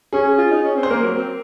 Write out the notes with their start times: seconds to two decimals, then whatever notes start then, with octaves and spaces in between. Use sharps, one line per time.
0.13 C#4 G#4
0.39 F4
0.51 D#4
0.65 C#4
0.77 C4
0.83 C5
0.90 A#3 A#4
1.03 F#3
1.16 C4